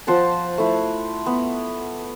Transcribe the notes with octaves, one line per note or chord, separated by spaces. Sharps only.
F3 C5 F#5 A5
A3 E4
B3